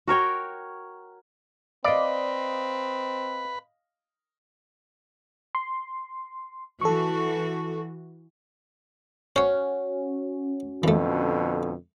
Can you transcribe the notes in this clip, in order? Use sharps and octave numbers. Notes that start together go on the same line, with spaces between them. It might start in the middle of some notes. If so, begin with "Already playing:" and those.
F#4 A#4 C#5 G5
C4 B4 D5 D#5 F5 B5
C6
E3 F#4 A4 C#6
C#4 F#4 C5 C#5
F2 B2 D3 E3 A3